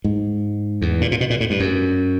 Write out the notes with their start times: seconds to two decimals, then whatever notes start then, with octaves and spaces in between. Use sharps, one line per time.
0.04 G#2
0.82 E2
1.01 A#2
1.12 A#2
1.21 B2
1.30 A#2
1.40 A2
1.50 G2
1.60 F#2